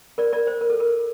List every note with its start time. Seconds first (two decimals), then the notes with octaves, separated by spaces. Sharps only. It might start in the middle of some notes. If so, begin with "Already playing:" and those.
0.18 A#4 D5
0.33 A#4 D5
0.47 C5
0.61 A#4
0.70 A4
0.80 A#4